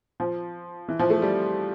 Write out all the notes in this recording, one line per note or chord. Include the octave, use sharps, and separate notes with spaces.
F3
E3
F3
A3
G3